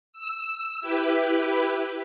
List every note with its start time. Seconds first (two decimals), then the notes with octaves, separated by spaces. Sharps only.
0.13 E6
0.81 E4 G4 B4